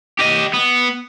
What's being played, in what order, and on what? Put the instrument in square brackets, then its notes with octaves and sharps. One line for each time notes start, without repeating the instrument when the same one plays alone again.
[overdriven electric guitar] G4 D#5
B3